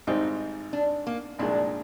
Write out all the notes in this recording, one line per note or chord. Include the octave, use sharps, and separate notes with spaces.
G#1 G#2 G3 C4 D#4
D4
A#3
C2 A#2 F3 G#3 D4